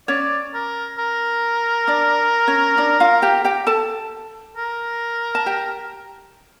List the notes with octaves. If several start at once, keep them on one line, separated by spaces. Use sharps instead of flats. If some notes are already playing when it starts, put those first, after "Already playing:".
C#4 C#5 D5
A#4
A#4
D4 D5
C#4 C#5
D4 D5
F4 F5
G4 G5
G4 G5
A4 A5
A#4
A5
G4 G5